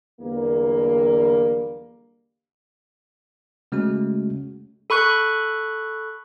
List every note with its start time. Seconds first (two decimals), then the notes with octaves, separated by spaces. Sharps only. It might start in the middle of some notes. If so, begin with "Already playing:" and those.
0.21 E2 D3 F#3 G3 A#3
3.72 C#3 G#3 A3 C#4 F#4
4.90 A4 B5 C#6 F#6